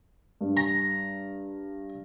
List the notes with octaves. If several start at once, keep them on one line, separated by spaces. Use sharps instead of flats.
G2
A#5